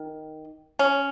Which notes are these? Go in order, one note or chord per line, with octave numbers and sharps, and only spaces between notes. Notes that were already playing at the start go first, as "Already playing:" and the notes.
Already playing: D#3
C#4